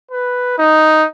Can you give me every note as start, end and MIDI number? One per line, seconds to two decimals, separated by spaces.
0.11 0.58 71
0.59 1.06 63